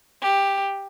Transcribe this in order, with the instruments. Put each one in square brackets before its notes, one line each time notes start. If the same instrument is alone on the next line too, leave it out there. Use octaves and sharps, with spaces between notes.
[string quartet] G4